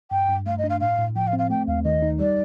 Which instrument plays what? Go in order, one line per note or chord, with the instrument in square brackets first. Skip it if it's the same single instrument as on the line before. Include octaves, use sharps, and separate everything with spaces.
[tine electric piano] G2 [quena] G5
[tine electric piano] G2
[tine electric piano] A3 [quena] F5
[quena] D#5
[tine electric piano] D4
[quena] F5
[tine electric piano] A2 [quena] F5
[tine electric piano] A2
[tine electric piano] F3 [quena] G5
[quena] F5
[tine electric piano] C4
[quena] F5
[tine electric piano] A3 [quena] G5
[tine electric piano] D#2 [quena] F5
[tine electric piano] D#3 [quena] D#5
[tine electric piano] D#4
[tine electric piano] G3 [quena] D5